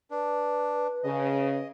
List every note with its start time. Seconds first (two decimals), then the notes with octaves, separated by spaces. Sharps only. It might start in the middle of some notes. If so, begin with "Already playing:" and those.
0.11 D4 B4
1.04 C#3 D#5